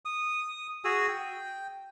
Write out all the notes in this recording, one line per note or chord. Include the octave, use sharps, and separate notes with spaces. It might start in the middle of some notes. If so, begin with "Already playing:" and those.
D#6
F#4 G#4 G#5 E6
G5